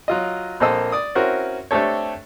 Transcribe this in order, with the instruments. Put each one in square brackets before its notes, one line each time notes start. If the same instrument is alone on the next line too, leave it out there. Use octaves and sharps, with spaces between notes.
[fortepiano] F#3 F4 D#5
A#1 A#3 C4 A4 D#5 E6
D5 D#6
C4 C#4 E4 F#4 A#4
A3 C4 D4 G4 A4 C#5